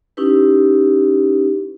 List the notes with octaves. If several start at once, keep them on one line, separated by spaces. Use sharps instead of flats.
C#4 D#4 E4 G4 B4